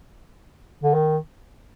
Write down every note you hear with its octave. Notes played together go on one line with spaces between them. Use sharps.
D3
D#3